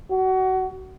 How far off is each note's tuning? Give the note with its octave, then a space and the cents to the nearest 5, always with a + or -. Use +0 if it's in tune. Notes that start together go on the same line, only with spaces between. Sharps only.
F#4 +25